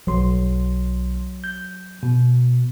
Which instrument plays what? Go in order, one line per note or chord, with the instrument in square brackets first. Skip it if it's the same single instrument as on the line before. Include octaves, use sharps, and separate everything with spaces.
[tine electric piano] B1 C6 [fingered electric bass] F#3
[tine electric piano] G6
B2